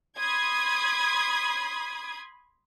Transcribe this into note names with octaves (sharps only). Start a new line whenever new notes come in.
B5 C6 D#6 G#6